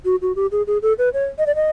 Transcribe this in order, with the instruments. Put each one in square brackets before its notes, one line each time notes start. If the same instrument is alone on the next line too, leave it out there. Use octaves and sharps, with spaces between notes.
[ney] F#4
F#4
G4
G#4
G#4
A4
B4
C#5
D#5
D5
D#5